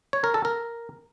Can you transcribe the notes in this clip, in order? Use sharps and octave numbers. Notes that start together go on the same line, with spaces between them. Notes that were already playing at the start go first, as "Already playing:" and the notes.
C#5
A#4
A4
A#4